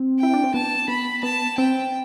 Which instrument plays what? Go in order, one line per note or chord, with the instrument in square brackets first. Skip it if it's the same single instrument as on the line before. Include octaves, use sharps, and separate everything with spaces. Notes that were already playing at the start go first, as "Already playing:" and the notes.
Already playing: [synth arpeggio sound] C4
[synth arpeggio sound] E4 [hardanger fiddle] G5
[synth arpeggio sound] D4
C4
[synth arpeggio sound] B3 [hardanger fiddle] A5
[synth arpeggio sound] B3 [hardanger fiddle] B5
[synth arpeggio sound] B3 [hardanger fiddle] A5
[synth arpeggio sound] C4 [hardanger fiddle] G5